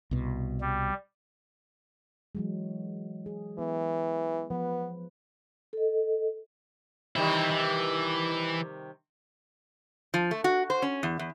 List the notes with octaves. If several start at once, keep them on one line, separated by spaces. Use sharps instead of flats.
C2 B2
G3
E3 F#3 G#3
G#4
E3 B3
F3 B3 B4
A4 D#5
C3 D#3 E3 G3 E4
E3
F3
A3
F#4
C5
C#4
E2
E2